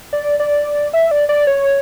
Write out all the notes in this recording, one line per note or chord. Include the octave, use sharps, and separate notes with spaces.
D5
D5
E5
D5
D5
C#5